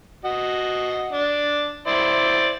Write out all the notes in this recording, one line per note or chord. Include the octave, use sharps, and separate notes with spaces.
F#4 D#5
D4
E4 C5 D5